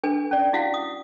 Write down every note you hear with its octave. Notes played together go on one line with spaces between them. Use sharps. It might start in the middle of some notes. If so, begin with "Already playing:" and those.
D4 A4 B4 G#5
C#4 D5
E4 F#4 F5 F#5
D#6